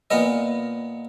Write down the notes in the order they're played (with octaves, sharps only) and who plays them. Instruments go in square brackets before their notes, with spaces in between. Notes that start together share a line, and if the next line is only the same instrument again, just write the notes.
[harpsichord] A#2 B3 D#5